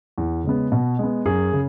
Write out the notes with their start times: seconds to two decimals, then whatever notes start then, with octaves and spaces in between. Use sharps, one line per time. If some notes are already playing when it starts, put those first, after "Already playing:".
0.18 E2
0.44 C#3 G#3 B3
0.72 B2
0.99 G#3 B3
1.26 F#2 G#4
1.53 C#3